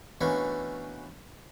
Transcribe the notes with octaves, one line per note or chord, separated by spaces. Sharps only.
B2 E3 A3 A#3 C#4 D4